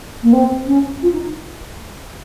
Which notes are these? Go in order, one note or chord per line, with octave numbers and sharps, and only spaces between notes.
A#3
C4
C#4
F4
D#4